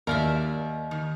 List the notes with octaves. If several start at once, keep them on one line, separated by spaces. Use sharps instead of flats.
D#2 A#4 D5 E5
D#3